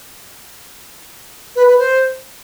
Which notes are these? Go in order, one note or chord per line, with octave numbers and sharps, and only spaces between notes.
B4
B4
C5